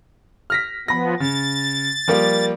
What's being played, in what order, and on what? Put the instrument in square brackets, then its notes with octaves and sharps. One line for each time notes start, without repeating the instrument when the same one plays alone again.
[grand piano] F6 A#6 B6
[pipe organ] F3 B3 [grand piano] B5 A#6
[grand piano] C#3 [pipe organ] A6
[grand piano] F3 G3 A#3